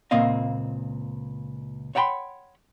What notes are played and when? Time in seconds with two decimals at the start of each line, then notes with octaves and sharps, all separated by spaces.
0.11 C#2 A#2 A#3 C4 D#5 F5
1.95 C#5 F#5 G5 A5 B5 C6